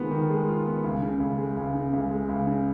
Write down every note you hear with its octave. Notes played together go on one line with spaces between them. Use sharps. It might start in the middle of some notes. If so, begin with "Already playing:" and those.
Already playing: D#3 G#3 B3 F4
D#3
G#3
F4
B3
C#2
C#3
C#2
G#3
C#2
C#3
C#2
G#3
C#2
C#3